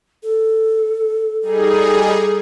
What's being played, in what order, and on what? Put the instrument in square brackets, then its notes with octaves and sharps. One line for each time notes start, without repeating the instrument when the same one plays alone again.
[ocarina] A4
[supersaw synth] G3 D#4 G#4 [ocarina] A4